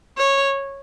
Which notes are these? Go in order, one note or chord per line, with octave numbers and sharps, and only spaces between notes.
C#5